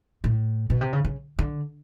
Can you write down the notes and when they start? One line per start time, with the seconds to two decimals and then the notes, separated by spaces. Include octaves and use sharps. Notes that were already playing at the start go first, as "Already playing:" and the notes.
0.24 A2
0.70 B2
0.81 C3
0.93 C#3
1.05 C#3
1.39 D3